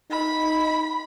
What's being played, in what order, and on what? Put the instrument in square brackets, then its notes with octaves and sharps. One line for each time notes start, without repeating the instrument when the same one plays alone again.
[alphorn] D#4 [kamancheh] B5